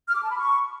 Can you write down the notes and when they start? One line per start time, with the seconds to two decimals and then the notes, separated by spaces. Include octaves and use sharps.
0.08 F6
0.15 D6
0.23 A5
0.31 B5
0.38 C#6